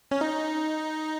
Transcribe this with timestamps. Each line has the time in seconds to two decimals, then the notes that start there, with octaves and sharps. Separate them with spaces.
0.11 C#4
0.21 D#4